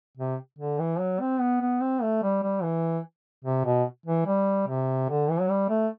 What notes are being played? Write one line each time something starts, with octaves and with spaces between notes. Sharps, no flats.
C3
D3
E3
F#3
C4
B3
B3
C4
A3
G3
G3
E3
C3
B2
E3
G3
C3
D3
E3
F#3
G3
A3